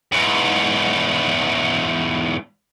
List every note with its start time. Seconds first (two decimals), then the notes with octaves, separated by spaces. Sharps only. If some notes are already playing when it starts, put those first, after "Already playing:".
0.12 E2 G#2